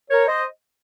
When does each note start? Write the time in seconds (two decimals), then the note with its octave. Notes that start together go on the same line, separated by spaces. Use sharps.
0.09 A#4 C#5
0.26 C5 D#5